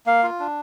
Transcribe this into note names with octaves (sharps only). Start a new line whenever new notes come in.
A#3 F5
F4
D4